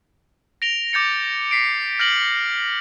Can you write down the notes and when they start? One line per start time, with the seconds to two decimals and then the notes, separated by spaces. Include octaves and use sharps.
0.62 A#6 D7 F7 G7
0.92 D6 G6 A6 C#7 F7
1.51 B6 C7 D7
1.99 F6 G6 A#6 D7 F#7